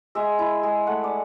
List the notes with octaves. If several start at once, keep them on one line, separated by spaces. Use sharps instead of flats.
G#3 E5
E4
G#3
A3 F#5
D5